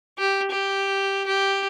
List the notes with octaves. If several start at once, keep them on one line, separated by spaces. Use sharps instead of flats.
G4
G4
G4